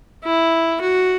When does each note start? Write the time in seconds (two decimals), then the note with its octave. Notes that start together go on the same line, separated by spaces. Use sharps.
0.24 E4
0.81 F#4